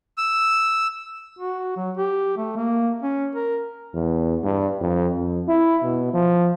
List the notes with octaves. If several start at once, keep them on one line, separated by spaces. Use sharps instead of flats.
E6
F#4
F#3
G4
A3
A#3
C#4
A#4
E2
G2
F2
F2
E4
B2
F3